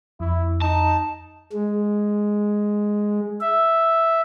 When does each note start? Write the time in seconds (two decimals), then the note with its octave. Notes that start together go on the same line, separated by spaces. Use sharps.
0.20 F2 E4
0.62 D#4 A5
1.52 G#3
3.40 E5